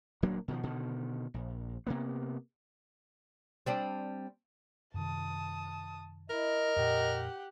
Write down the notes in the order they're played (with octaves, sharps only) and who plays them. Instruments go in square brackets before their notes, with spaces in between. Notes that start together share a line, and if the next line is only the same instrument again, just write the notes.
[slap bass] D#1 F#3 A#3 D4
B2 D#3 F3
B2 D3 D#3
A#1
C3 A#3 B3
[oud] G3 C4 D4
[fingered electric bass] F#2 C3 D#3 [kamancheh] A5 D#6
[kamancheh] E4 [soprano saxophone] A#4 [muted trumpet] D#5
[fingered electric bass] F2 A#2 [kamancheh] G4 F#5